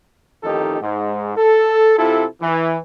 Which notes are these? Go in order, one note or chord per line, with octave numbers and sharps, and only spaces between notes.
A1 F2 D#3 D#4 G4 A4
G#2
A4
C3 E4 F4 A4
E3